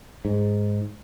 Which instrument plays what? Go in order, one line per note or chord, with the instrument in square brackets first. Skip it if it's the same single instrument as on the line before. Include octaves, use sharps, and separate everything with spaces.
[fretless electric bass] G#2